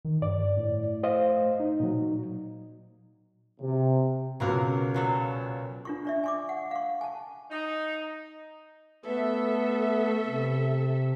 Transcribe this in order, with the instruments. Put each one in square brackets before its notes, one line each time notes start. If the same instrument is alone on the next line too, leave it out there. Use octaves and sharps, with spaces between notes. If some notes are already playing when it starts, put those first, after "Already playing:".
[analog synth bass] D#3
[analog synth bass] G2 [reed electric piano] D5
[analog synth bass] A2
[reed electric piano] C5 D#5 F5
[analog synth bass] D#4
[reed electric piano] A#2 F#3
[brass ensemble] C3
[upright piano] C#2 B2 [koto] F#3 A#3 A#4
[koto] A#2 F#3 A4
[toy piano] D4 F4 C#6
D4 D5 E5
G#5 C#6 D6
F#5
F5 C#6
G#5 A5
[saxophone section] D#4
[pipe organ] A3 B3 [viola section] A4 E5
[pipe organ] C3